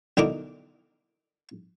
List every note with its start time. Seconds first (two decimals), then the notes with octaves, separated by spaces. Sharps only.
0.17 B1 D3 D#4 E4 A#4 D6